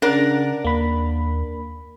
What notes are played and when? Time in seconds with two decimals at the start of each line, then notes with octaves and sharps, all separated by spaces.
0.02 C#3 D4 A#4 F#5
0.65 D#2 A#3 B5